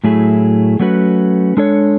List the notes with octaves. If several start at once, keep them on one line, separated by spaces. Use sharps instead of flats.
A2 F#3 A3 E4 G#4
F#3 A3 C#4 F#4 B4
G#3 D4 A4 C#5